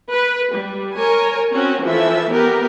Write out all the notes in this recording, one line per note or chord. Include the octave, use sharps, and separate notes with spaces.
B4
G3
A#4 C#5 G#5
C4 C#4 F#4 C#5
E3 F3 A4 E5
B3 G4 A#4